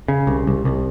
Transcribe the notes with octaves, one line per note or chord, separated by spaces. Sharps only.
C#3
C2
C2
C2